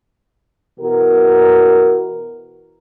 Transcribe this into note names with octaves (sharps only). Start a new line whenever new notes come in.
B2 E3 F#4 A#4